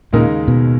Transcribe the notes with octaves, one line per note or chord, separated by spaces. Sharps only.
D#2 A#2 C#3 G#3 D#4 A#4
B2